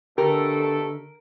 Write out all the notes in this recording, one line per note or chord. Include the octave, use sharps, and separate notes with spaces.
B2 D3 A3 G4 A4 A#4